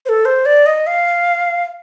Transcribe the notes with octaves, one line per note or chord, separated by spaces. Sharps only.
C5
A4
C5
D5
D#5
F5